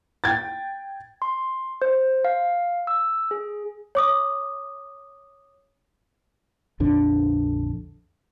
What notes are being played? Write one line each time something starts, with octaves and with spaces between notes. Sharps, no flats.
G5 G#6 A6
C6
C5
F5
E6
G#4
C#5 D6 D#6
A#1 F2 D3 D4